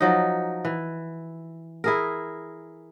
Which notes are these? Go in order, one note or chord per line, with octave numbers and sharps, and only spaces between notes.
F3 F#3 D#4
E3
E4 G#4 A#4